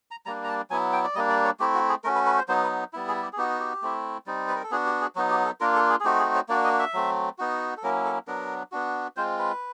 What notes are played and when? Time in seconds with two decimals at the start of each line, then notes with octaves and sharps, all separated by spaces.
0.11 A#5
0.26 G3 A#3 D4 A#5
0.44 A#5
0.48 A5
0.70 F#3 B3 E4 G#5
0.93 G5
1.04 D5
1.15 G3 A#3 D4 D#5
1.30 D5
1.45 C#5
1.60 A3 C4 E4 G4
1.74 F#4
1.89 G#4
2.04 A3 C#4 F#4 A#4
2.15 B4
2.26 B4
2.38 C5
2.48 F#3 B3 D#4 C5
2.63 B4
2.93 G3 B3 E4
3.08 G#4
3.22 G4
3.33 G#4
3.37 B3 D#4 F#4 G4
3.60 G4
3.82 A3 C4 E4
4.26 G3 C4 D#4
4.48 B4
4.55 A#4
4.63 A4
4.71 B3 D4 F#4 G#4
4.86 G4
5.01 G#4
5.16 F#3 B3 D#4 F#4
5.30 G4
5.45 A4
5.61 A#3 D4 F4 A#4
5.75 A4
5.89 G#4
6.00 G#4
6.05 A3 C4 D#4 F#4 G4
6.19 G#4
6.35 C#5
6.49 A#3 D4 F#4 D5
6.64 D#5
6.79 E5
6.93 F#3 A3 C4
7.38 B3 D#4 F#4
7.77 A4
7.83 F#3 A#3 C#4 E4 A#4
8.05 A4
8.27 F#3 B3 D4 A#4
8.72 B3 D4 F#4
9.16 G#3 C4 F4 C5
9.39 B4